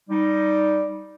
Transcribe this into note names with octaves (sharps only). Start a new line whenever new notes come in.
G3 D#4